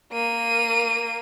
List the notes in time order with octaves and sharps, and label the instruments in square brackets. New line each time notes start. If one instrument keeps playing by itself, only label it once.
[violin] A#3 D#7